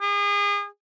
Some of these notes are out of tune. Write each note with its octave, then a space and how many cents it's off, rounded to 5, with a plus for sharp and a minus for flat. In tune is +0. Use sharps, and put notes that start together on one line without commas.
G#4 -35